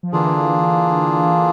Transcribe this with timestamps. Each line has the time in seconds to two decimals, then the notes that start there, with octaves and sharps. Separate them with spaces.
0.03 F3
0.12 D3 E3 A#3 D4 F4 G#4